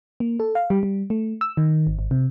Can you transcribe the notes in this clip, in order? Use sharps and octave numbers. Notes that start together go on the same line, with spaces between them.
A#3
A4
F5
G3
G3
A3
E6
D#3
G#1
G#1
C3